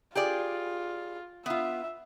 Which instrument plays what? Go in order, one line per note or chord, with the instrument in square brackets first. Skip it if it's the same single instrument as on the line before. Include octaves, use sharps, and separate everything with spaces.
[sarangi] F4 [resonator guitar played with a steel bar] G4 G#4 D5
[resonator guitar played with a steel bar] B3 F4 [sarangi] E5